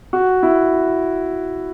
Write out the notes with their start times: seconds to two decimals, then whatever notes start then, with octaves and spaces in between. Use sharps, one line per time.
0.13 F#4
0.43 E4